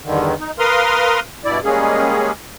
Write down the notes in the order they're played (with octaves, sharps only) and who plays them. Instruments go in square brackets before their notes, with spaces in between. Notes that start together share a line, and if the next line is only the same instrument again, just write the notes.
[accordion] E2 G2 D3 D#3
D#4
A#4 B4 F5 C6 D#6 F6
G2 B2 E4 D5
G3 G#3 A#3 C#4 G#4